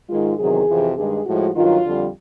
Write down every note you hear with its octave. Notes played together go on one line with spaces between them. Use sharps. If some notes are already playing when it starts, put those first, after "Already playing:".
G#2 D#3 G#3 F4
E2 C3 D#3 F#3 G#4
F2 C3 E3
G2 D#3 G#3 G#4
A2 F3 G#3 F#4
G2 D#3 F#3 F4
F2 D3 G3